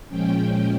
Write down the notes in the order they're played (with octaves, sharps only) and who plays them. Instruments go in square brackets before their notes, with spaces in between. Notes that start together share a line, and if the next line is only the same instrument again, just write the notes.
[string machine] A#2 F3 G#3 C#4 G5